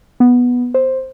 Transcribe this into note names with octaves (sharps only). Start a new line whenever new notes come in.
B3
C5